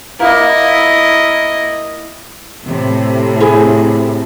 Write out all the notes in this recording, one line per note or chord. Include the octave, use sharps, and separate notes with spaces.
A#3 E4 D#5
A2 C3
E4 G#4